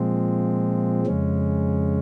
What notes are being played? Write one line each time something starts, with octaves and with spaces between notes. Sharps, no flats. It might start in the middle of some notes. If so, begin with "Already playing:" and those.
Already playing: A#2 F3 G#3 C4
F2 C#3 G#3 C#4